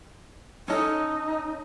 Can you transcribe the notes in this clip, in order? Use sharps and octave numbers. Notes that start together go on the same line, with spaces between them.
C#4 D#4 A4